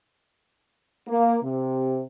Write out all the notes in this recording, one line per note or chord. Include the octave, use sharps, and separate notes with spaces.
A#3
C3